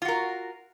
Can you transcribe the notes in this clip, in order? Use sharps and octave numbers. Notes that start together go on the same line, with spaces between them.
F4 F#4 A#4